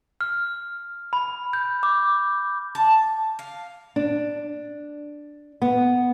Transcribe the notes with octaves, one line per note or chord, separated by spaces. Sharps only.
F6
B5
G6
D6
A5
F5
D4
B3